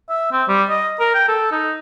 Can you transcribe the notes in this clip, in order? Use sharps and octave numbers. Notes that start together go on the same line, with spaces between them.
E5
C4
G3
D#5
A#4
G5
A4
D#4